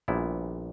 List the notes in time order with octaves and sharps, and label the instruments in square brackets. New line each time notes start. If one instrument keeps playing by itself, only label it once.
[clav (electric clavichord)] A#1 A#2 G3 B3 E4